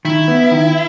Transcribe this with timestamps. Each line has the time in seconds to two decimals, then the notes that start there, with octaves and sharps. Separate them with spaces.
0.05 D#3 E4
0.28 B3
0.51 D#3